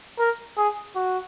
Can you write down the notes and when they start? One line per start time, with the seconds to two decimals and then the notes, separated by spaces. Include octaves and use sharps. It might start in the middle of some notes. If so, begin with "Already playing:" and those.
0.19 A#4
0.57 G#4
0.96 F#4